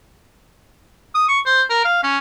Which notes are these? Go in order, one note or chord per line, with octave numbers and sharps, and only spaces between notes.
D#6
C#6
C5
A#4
F5
C#4